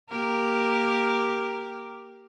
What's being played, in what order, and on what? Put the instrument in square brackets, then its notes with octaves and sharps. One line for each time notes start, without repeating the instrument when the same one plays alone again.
[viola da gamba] A#3 G4 A#4